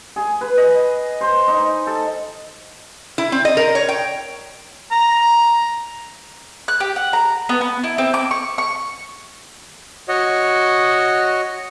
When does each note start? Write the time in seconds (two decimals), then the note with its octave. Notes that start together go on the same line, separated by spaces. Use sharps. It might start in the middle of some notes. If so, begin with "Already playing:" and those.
0.16 G#4
0.41 B4
0.57 D#5
1.21 C5
1.48 D#4
1.87 A4
3.18 E4
3.32 C4
3.45 D#5
3.57 A#4
3.75 C#5
3.89 G5
4.91 A#5
6.68 F#6
6.80 G4
6.96 F#5
7.13 A#5
7.49 B3
7.61 B3
7.84 E4
7.98 C4
8.14 D6
8.31 C#6
8.58 C#6
10.08 F#4 C#5 D#5